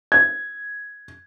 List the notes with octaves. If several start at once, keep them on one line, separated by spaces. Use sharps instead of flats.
G#6